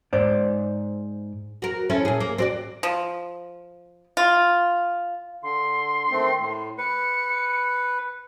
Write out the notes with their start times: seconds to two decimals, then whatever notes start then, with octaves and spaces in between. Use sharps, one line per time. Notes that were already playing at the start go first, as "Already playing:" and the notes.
0.13 G#2 C5 D5
1.62 F#4 A#4
1.90 C#4 E4 A4
2.05 A#2 G#4
2.20 A#3
2.38 C4 F#4 D5
2.83 F3
4.17 F4
5.43 D3 C6
6.11 D#3 A3 C4
6.40 A2
6.78 B4 C#7